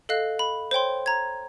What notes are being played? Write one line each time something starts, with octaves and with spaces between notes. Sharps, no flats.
A4 D#5 F5 F#6
B5
C5 C#5 G5 C6
A#5 G#6